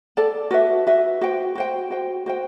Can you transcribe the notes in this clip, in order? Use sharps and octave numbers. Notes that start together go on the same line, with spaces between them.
A4 D5 A5
F#4 B4 E5
F#4 B4 E5
F#4 C5 G5
F#4 C5 G5
F#4 C5 G5
F#4 C5 G5